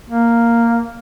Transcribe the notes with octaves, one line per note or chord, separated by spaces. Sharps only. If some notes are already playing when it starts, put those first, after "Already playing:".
A#3